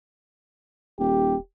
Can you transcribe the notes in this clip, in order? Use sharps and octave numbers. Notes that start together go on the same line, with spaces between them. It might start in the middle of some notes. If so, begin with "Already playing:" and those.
D#1 G4